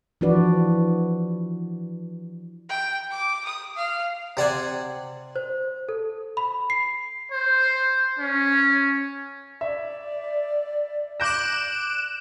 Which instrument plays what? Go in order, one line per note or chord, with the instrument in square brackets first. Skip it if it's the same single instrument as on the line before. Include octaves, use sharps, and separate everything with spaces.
[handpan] E3 F3 D4 F#4 B4 D5
[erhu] G5
D6
D#6
F5
[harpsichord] C3 D5 F#5 G#5
[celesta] C5
A4
B5
C7
[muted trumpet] C5
C#4
[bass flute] D5 [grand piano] E5
[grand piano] D6 G6 A#6 [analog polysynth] F#6 D7 E7